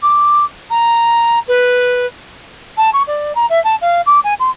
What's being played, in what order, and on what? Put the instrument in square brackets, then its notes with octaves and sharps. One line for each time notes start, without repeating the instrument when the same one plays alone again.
[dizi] D6
A#5
B4
A5
C#6
D5
A#5
E5
A5
F5
D6
G#5
C6